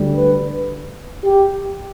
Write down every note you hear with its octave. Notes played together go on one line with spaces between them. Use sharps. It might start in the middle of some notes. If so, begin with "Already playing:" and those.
Already playing: D2 D3 G3
B4
G4